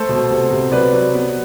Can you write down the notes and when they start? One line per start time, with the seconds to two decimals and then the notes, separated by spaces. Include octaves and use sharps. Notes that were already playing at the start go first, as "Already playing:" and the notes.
Already playing: A3 A4 C5
0.09 B2
0.31 C3
0.51 C3
0.72 F#3 B4 D5
0.93 F#3
1.14 B3